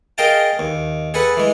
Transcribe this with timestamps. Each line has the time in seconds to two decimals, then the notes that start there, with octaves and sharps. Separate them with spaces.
0.18 G#4 A#4 D#5 F5 G5 A5
0.59 D#2
1.14 G#4 A4 B4 F#5
1.37 E3 G#3